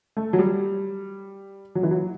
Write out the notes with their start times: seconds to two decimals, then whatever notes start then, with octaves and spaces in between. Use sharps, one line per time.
0.17 A3
0.33 F#3
0.39 G3
1.75 F#3
1.83 E3
1.91 F#3